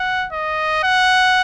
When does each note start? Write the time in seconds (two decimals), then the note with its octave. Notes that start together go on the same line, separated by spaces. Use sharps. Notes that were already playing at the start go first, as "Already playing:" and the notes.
Already playing: F#5
0.32 D#5
0.83 F#5